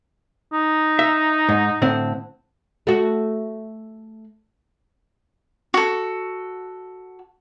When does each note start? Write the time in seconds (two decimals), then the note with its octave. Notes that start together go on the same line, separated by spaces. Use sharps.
0.53 D#4
0.99 E5
1.49 G#2
1.82 A2 D3 C4
2.87 A3 F#4
5.74 F#4 A4